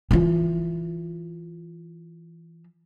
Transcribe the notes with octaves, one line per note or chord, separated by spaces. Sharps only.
E3 F4